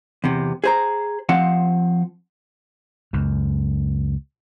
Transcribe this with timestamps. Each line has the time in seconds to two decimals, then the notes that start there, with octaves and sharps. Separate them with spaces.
0.24 E2 C3
0.64 G#4 C5 A#5
1.29 F3 C4 F5 F#5
3.13 C#2 F#2